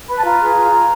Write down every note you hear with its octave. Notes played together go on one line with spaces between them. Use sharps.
B4 B5
A5
F4 A#5
G#4
F4
F4